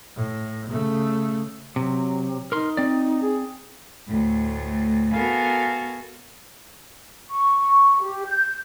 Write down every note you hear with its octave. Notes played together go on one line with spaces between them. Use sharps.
A2
C#3 A3
C3 F#3
D#4 A#4 C6
C4 D5
G#4
D2 A2
B3 F#4 A4 A#4 F5 G#5
C#6
G4
G6